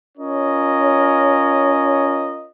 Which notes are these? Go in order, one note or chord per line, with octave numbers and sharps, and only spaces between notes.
C#4 F4 A#4 C#5 D#5